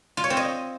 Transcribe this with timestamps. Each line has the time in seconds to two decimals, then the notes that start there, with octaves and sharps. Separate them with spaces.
0.17 F4
0.24 C#5
0.30 C4
0.37 D#5